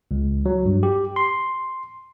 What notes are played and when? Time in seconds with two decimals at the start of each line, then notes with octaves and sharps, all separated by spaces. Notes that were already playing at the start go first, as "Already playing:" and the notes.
0.11 C#2
0.46 F#3
0.66 G2
0.83 G4
1.16 C6